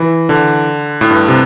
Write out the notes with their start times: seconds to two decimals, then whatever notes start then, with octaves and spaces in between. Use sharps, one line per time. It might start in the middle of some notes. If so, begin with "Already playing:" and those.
Already playing: E3
0.29 D3
1.01 A2
1.11 G2
1.28 C3